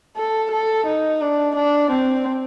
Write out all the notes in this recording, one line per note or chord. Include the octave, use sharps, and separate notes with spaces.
A4
A4
D#4
D4
D4
C4